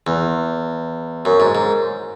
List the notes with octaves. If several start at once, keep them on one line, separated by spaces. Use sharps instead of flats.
E2
F#2
G#2
G#2